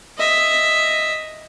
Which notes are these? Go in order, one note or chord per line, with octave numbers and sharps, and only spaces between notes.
D#5 E5